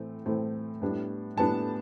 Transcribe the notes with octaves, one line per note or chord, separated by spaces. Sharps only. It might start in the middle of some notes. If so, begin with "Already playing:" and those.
Already playing: A2 E3 A3 C4
A2 E3 A3 C4
A2 G3 B3 D4
A2 G3 B3 D4 A5